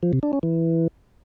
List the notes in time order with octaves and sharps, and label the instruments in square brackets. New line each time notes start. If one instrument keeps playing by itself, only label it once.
[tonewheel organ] F3
C3
D4
C#4
E3